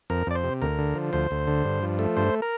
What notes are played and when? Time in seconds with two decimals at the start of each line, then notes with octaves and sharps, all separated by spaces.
0.10 F2 A#4
0.27 F2 D5
0.35 C5
0.44 C3
0.61 D2 A#4
0.78 D3
0.95 F3
1.13 D2 C5
1.31 D2
1.47 D3
1.65 G2
1.83 F3
1.99 A3
2.17 G2 C5
2.42 A#4